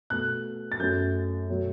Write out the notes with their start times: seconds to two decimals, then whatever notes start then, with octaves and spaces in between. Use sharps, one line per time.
0.10 B2 A3 F#6
0.72 A6
0.79 F#2 F#3 A3 G6
1.49 B2 F#3 A3